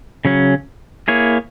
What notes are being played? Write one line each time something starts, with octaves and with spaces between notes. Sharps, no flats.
C#3 F#3 C#4
A#3 E4 G#4 C#5